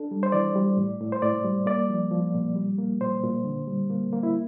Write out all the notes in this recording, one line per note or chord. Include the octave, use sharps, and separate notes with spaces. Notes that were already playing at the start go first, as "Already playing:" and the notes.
Already playing: D4 A4
G3
C5
E3 D5
G3
A2
A2
C5
A2 D5
G3
A#3 D5
F3
F3
A#2
G3
A#3
A#2 C5
A#2
D3
G3
A#3
A#3
E4